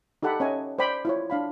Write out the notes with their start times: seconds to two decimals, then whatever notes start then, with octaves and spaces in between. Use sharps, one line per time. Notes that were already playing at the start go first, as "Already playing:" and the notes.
0.23 D#4 G4 A4 F#5 A5 B5
0.40 C#4 C#5 D#5 E5 G#5
0.79 C5 D5 G5 B5
1.05 E4 F4 C#5
1.30 D4 F5 B5